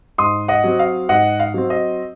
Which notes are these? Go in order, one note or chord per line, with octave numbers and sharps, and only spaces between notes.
G#2 C6 D#6
D#5 F#5
F#3 C4
F5
G#2 D#5 F#5
F5
F#3 C4
D#5